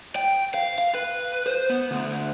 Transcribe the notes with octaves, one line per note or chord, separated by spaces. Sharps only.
G5
F5
F5
B4
C5
B3
D2